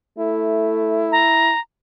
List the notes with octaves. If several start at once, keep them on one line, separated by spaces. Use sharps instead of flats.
A3 E4
A#5